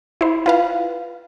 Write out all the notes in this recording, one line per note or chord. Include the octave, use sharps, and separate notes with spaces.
E4 C5
F4 B4 F5